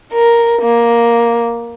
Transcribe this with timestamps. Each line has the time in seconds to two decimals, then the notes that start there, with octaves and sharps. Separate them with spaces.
0.13 A#4
0.62 A#3